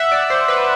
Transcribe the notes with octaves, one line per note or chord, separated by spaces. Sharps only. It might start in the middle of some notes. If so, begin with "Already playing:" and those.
Already playing: E5 F#5
D5
C5
B4